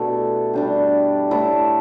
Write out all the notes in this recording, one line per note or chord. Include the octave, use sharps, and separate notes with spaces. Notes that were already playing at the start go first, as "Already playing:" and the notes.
Already playing: B2 A3 D4 E4 G4 A4
G3 D4 G4
A2 A3 E4 A4